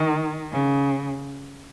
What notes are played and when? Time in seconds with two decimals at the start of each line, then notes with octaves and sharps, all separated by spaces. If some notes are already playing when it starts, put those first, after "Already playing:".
Already playing: D#3
0.52 C#3